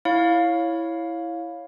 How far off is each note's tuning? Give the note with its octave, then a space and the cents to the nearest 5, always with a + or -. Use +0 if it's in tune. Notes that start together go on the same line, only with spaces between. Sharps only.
E4 +0 C#5 +0 F5 +10